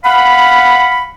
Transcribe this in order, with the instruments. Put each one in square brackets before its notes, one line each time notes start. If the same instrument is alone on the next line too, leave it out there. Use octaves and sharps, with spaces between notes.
[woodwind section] F5 F#5 B5